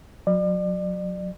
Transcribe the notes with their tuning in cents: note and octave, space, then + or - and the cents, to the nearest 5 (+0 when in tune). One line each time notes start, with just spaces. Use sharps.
F#3 -25 D5 +35